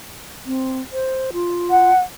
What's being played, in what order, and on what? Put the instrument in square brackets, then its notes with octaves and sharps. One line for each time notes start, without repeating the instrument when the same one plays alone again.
[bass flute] C4
C5
F4
[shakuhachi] F#5